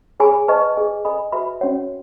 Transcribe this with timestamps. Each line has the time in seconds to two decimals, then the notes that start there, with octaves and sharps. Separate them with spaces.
0.20 G#4 C#5 G#5 B5
0.48 B4 D#5 A5 C#6
0.76 G#4 D#5 G#5
1.05 A4 D#5 G#5 B5
1.32 F#4 B4 E5 B5
1.61 C#4 F#4 C#5 F#5